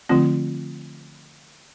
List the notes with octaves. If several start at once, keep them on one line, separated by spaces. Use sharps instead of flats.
D3 F3 A3 C4 F4